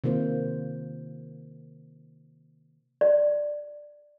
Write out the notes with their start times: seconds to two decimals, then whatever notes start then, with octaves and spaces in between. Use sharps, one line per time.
0.04 C3 D#3 A#3 F4 C5
3.01 D5